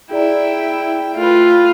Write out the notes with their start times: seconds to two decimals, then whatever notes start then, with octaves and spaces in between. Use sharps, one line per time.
0.11 E4 G#4 D5 G5 A#5
1.17 A3 F4 B4